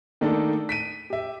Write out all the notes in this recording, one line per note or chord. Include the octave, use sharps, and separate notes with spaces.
D#3 A3 A#3 D4 D#4 A4
B6 D7 D#7
G4 E5